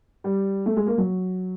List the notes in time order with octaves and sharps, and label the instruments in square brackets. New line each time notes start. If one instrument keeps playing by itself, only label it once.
[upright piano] G3
A3
G#3
A#3
F#3